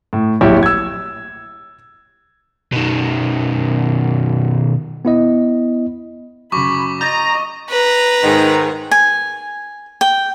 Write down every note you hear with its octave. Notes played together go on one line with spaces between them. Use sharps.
A2
D1 A#1 E4 G4 C#5
E6 G#6
B2 D#3
B3 E4 D#5
F#2 C#3 B5 C#6 D6
D#5 A#5 G6 A6 A#6
B4 A#5
G#2 D#3
G#5
G5